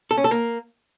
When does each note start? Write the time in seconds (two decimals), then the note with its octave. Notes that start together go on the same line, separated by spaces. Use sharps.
0.11 A4
0.18 C#4
0.24 A4
0.31 A#3